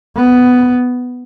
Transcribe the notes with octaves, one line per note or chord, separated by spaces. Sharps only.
B3